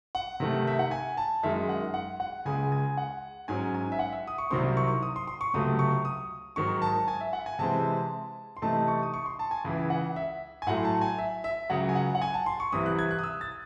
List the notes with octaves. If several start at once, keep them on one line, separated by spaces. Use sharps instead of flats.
F#5
C3 D#3 A3
E5
F#5
G#5
A5
F#2 D#3 G#3 E5
F#5
F#5
F#5
C#2 C#3 G#3 G#5
G#5
F#5
G#2 F#3 C#4 G#5
G#5
E5
F#5
E5
D#6
C#6
C2 C3 D#3 F#3 C4 C6
C#6
D#6
C6
C6
C#6
C#2 C3 F#3 A3 D#6
C#6
D#6
G#2 D#3 F#3 C#6
A5
G#5
E5
F#5
G#5
C3 E3 G#3 C4 A5
C6
C3 E3 A3 D#4 A5
C#6
D#6
C#6
C6
A5
G#5
C#2 C#3 E3 G#5
F#5
E5
G#5
A2 F#3 A3 F#5
C6
A5
G#5
E5
E5
C#2 C#3 F#3 F#5
G#5
F#5
F#5
G#5
A5
C6
C#6
C2 C3 E3 D#6
F#6
G#6
F#6
D#6
E6
A6